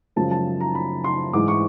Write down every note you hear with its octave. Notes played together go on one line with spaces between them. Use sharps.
F#2 C#3 F3 G#3 A5
A5
A#5
B5
C6
G#2 E3 G#3 D6
C#6